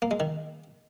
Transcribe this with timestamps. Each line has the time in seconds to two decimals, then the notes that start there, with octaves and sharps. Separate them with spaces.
0.02 A#3
0.11 G#3
0.20 D#3